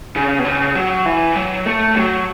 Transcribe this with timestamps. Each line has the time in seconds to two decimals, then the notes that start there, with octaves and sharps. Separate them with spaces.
0.16 C#3
0.39 B2
0.45 C#3
0.75 F#3
1.06 E3
1.36 F#3
1.66 A3
1.95 F#3